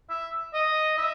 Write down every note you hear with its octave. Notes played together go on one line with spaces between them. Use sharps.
E5
D#5
E5